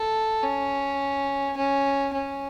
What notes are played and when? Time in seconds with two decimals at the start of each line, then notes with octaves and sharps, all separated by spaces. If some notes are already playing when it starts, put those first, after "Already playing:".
Already playing: A4
0.43 C#4
1.57 C#4
2.14 C#4